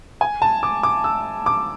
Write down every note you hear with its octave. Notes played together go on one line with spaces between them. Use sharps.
G#5
A5
D6
D6
E6
D6